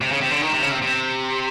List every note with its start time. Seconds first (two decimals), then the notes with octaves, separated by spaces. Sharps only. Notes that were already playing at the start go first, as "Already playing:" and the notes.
0.01 C3
0.12 C#3
0.21 C3
0.31 D3
0.42 D#3
0.53 C3
0.62 C#3
0.72 C3
0.82 C3